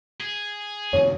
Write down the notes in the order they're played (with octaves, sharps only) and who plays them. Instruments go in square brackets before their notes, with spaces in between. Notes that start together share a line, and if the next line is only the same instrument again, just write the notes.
[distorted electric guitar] G#4
[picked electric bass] F2 C3 D#3 [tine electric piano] C#5